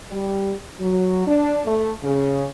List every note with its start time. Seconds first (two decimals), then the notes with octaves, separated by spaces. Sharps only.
0.11 G3
0.80 F#3
1.27 D4
1.65 A3
2.03 C#3